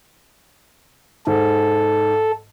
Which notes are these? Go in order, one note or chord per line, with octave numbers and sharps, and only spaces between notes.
G#2 A4